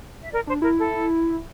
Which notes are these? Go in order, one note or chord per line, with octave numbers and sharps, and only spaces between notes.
E5
A#4 D5
D4 C5
E4 A#4
A4